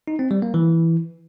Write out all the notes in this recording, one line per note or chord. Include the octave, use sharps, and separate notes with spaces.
D#4
C4
G3
A#3
E3